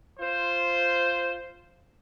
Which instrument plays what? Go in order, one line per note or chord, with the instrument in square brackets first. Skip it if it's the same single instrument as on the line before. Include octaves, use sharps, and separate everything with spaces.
[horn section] F4 C5